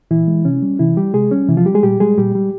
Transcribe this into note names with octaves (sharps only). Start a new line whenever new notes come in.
A#2 E3 E4
G#3
C3 C#4
G3
C3 E3 E4
G3 G4
C3 G#3 G#4
G3 C#4
C3 E3 E4
F3 F4
G3 G4
G#3 G#4
A#2 G3 G4
G3 G#3 G#4
A#2 G3 G4
G3